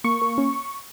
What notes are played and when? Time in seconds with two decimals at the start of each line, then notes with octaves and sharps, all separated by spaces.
0.04 A#3 C#6
0.22 A#3
0.38 C#4